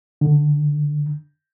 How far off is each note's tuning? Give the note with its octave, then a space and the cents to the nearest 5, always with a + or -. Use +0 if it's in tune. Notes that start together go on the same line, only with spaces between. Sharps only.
D3 +10